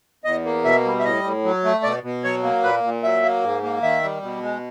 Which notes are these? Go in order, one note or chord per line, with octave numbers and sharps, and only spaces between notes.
E2 D#5
A#3
B2 E5
G3
E5
A2 D#5
A2
F#3
A3
B2 D5
B2
F#3 C#5
A#3
A#2 B4
A#2
F#3 E5
A#3
G#2
A#3
D#3 E5
G3
B2
G#3